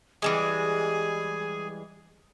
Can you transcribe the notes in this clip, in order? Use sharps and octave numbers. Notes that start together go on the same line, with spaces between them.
E3 G3 G#3 G#4